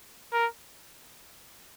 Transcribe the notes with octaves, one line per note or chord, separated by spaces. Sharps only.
A#4